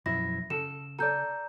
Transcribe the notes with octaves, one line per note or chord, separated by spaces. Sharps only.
F#2 B2 F3 E4 A#6
C#3 A4 E7
A4 D5 A#5 G6